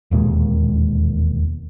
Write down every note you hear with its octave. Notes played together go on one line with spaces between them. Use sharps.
E1 D#2 A#2 G#3